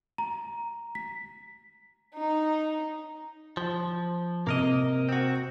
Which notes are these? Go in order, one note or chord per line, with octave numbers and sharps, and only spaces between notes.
A#5
B6
D#4
F3
C3 A#3 A#4 D#5
C4 F#4